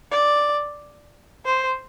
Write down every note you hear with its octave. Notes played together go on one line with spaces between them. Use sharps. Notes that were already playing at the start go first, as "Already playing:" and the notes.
D5
C5